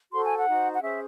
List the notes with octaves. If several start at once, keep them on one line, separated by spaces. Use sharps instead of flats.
F#4 A4 C5 C6
G#5
F#5
D#4 F#4 C5
F#5
C#4 G#4 C5 E5